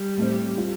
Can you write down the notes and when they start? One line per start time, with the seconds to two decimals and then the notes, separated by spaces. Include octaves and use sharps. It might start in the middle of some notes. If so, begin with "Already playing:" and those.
Already playing: G3
0.17 A2 A3 C4
0.57 G3 F4